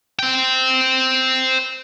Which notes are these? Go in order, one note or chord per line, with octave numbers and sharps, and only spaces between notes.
C5 G5